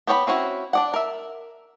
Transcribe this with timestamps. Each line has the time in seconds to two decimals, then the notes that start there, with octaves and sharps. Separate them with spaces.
0.07 B3 G4 C#5 D5 B5
0.27 C4 C#4 E4 F#4
0.73 D4 D5 F#5
0.94 A#4 E5